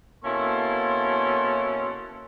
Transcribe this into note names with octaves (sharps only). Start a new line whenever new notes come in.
B2 A#3 C#4 E4 A4 C6